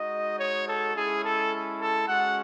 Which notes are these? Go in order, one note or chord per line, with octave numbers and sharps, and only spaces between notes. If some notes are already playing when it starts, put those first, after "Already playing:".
Already playing: G#3 D#4 F#4 D#5
C#5
A4
G#3 C#4 E4 G#4
A4
A4
G#3 C#4 F#4 F#5